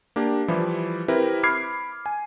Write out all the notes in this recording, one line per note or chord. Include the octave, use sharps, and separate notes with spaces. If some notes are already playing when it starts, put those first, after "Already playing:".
A#3 D4 G4
E3 F3 G3 E4
C4 E4 G4 A#4 B4
B5 D6 F6 G#6 C7
G#5